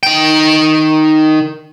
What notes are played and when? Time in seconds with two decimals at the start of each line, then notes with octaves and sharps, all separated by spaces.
0.03 D#3 G5